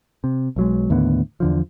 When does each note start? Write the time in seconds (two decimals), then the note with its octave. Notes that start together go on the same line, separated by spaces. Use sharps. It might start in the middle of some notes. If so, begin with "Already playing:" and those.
0.24 C3
0.56 B1 F#3 G#3
0.90 D#2 A2 D3 B3
1.40 E2 D3 F3